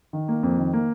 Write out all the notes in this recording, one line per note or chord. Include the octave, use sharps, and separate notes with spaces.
D#3
A#3
F2
D#3
A#3